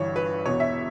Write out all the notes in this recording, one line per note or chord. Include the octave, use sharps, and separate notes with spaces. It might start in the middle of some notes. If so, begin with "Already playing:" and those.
Already playing: G1 G2 E3 C#5
B4
E1 E2 B2 C#5
E5